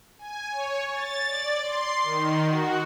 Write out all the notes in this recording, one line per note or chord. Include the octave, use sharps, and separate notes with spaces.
G#5
C#5
A6
D5
C6
D#3
F#4